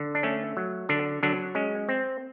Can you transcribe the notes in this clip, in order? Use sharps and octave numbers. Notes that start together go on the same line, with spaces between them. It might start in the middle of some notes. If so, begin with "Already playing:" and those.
Already playing: D3
D4
A3 C#4
F#3
D3 D4
D3 F#3 D4
G#3 C#4
C4